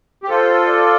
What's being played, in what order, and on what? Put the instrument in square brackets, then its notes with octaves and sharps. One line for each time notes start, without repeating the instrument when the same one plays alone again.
[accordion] G4
[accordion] F4 A4 [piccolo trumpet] C5
[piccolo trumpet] D5